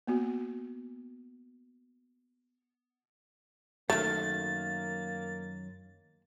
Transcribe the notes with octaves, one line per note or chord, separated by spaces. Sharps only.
A#3 B3 F#4
F#2 D#3 A3 A#3 A6